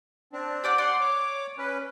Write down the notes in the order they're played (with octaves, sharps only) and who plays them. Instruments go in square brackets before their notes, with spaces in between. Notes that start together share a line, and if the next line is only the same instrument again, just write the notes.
[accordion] C4 D4
[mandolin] G4 D5 F#5
[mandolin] D5 [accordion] F#5 C6
[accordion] C#5 D6
C#4 B4